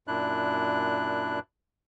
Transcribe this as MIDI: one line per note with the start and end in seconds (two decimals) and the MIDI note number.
0.08 1.39 42
0.08 1.39 46
0.08 1.39 62
0.08 1.39 64
0.08 1.39 90